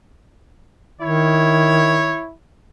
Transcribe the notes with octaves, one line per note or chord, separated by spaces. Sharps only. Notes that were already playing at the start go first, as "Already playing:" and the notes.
D#3 E4 C#5